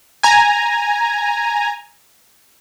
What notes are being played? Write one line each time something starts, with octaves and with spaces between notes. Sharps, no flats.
G#5 A#5